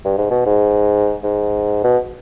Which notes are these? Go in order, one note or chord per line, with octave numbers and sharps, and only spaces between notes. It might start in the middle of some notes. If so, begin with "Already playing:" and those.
G2
G#2
B2
G#2
G#2
B2